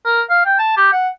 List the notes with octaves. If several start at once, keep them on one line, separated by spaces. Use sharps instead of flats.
A#4
F5
G5
A5
G4
F#5